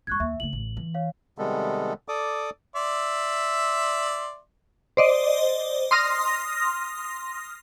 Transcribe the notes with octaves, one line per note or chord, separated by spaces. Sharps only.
F2 G#3 C#6 F#6 G#6
D#2 E5
C#3 A3 F#7
A1
E3
C#5 F5
C3 D#3 G3 G#3 B3 A4
A4 D5 D6 D#6
D5 E5 C6
C5 D5 D#5
C6 D#6 F6 A#6